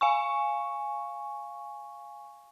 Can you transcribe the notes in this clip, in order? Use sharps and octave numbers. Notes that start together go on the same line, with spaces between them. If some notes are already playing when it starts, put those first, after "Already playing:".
F5 G#5 C#6